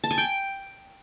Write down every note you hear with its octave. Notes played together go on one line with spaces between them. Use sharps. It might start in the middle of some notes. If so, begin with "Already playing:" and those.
A5
G#5
G5